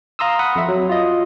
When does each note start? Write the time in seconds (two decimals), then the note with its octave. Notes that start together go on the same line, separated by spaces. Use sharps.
0.19 F5 A#5 C6 D#6 E6
0.39 F#5 B5 D#6
0.56 F2 E5
0.68 F#3
0.89 F4 D#5